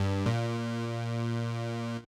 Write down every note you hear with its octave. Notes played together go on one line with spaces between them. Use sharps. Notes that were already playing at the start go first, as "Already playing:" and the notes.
Already playing: G2
A#2